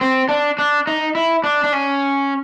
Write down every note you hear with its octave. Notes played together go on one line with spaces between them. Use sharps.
C4
D4
D4
D#4
E4
D4
D4
C#4